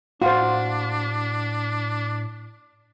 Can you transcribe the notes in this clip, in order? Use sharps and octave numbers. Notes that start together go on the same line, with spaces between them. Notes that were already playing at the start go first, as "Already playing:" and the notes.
A2 D4 F4 F#4 C5